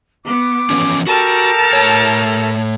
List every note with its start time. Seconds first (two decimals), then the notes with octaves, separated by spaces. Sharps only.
0.24 B3 D6
0.70 E3 F3 C#4
1.07 F#4 G4 A4 A#4 A5 F6
1.73 A2 C#5